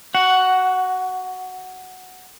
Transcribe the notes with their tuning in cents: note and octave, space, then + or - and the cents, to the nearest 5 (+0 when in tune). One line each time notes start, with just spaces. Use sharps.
F#4 +15 F#5 +0